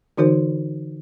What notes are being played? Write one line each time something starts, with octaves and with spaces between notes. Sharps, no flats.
D3 E3 D#4 F#4 A#4 C5